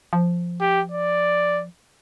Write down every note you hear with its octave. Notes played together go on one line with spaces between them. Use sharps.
F3
G4
D5